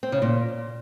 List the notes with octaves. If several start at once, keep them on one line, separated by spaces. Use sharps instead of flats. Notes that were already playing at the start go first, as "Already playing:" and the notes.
C4
C#3
A#2